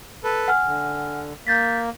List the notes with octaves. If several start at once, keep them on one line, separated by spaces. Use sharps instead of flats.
A4 B4
F#5 G#5 F6
D3
A#3 G6 A6 B6